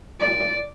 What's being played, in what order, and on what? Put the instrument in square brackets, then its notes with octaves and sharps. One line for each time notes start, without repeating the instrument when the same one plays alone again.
[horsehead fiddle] D5